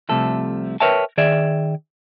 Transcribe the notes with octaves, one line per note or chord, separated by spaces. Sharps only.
C2 C3 F3 A3 A4
A#4 B4 C#5 E5 G5 A5
D#3 G#4 D5 E5